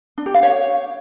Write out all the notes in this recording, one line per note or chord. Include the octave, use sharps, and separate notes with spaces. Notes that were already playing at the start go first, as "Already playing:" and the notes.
D4
G4
F5
C#5